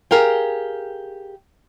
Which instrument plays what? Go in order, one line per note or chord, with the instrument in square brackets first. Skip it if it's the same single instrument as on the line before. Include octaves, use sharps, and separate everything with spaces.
[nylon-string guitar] G4 G#4 A#4 F5 G5